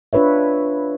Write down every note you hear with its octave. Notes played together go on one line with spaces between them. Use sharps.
D4 F4 B4 C#5 E5